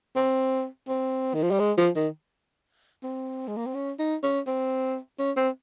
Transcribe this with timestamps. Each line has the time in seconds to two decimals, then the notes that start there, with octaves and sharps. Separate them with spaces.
0.16 C4
0.88 C4
1.34 D#3
1.43 F3
1.51 G3
1.59 G#3
1.77 F3
1.95 D#3
3.03 C4
3.48 G#3
3.57 A#3
3.66 C4
3.75 C#4
3.99 D#4
4.23 C#4
4.47 C4
5.19 C#4
5.37 C4